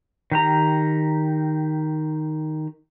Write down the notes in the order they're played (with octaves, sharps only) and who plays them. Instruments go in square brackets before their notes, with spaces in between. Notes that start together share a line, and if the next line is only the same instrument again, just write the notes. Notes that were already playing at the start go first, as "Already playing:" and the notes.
[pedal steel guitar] D#3 G4 A#5